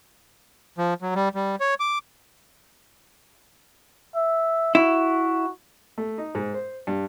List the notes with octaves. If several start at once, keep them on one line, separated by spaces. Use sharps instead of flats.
F3
F#3
G3
G3
C#5
D6
E5
E4 F#4
A3
D#4
G#2
C5
G2